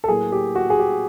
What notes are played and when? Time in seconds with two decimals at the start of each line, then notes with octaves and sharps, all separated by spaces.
0.04 A4
0.08 A2 F#3 A#3 G#4
0.32 G4
0.55 F#4
0.70 G#4
0.79 G4